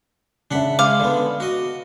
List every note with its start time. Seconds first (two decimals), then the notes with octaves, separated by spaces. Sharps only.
0.51 C#3 D4 E5 F#5 B5
0.79 G#3 F5 D6
1.00 D3 B3 D5
1.40 F#4 D#5